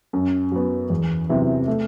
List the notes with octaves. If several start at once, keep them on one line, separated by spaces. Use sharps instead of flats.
F#2
F#3 B3
E2
C3 F#3 B3 E4
A3